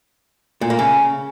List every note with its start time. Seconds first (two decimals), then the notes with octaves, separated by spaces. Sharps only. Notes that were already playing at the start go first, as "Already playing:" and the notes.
0.61 A#2
0.70 A#3
0.79 C#3